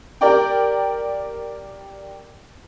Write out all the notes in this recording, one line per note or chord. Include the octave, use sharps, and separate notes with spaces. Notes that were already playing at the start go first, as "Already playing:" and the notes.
G4 A#4 D5 G5